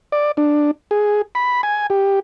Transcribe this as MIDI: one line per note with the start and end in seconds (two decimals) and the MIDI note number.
0.12 0.32 74
0.37 0.71 62
0.91 1.22 68
1.35 1.61 83
1.63 1.87 80
1.90 2.20 67